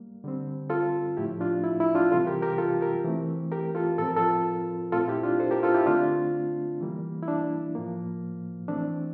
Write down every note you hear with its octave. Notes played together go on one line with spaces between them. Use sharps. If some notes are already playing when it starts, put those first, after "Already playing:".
Already playing: G3 A#3
D3 G3 C4
F4 A4
A2 F3 A3 E4 G4
D4 F4
E4
E4
D4 F4
C3 E3 G3 C4 F4 A4
G4 A#4
G4 A#4
F4 A4
G4 A#4
E3 A3 C4
G4 A#4
F4 A4
A2 F3 C4 A4
A#4
F4 A4
A#2 A3 C4 F4 A4
E4 G4
D4 F4
A4 C5
G4 A#4
F4 A4
E4 G4
D3 A3 C4 D4 F4
E3 G3 A#3
E4
D4
A2 F3 A#3
E3 A3 C4 D4